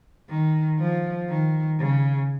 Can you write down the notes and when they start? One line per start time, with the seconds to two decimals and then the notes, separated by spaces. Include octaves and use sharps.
0.29 D#3
0.79 F3
1.29 D#3
1.80 C#3